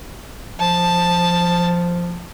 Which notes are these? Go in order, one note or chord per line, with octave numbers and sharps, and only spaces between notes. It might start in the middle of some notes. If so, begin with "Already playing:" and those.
F3 A5